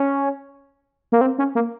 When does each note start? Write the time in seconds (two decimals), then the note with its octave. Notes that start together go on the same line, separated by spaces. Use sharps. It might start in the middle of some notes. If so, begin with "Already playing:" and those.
Already playing: C#4
1.12 A#3
1.21 C4
1.38 C#4
1.55 A#3